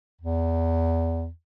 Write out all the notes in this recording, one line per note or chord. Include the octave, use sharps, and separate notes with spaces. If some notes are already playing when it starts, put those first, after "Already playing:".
E2